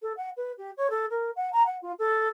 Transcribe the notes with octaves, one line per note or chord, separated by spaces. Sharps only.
A4
F#5
B4
G4
C#5
A4
A#4
F#5
A#5
F#5
F4
A4